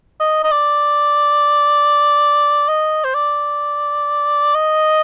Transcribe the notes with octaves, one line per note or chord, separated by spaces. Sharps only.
D#5
D#5
D5
D#5
C5
D5
D#5